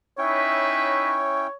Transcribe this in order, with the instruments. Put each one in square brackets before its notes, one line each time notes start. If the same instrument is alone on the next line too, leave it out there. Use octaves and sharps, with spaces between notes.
[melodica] C#4 E4 G5 [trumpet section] D#4 B4 E5 [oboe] C#5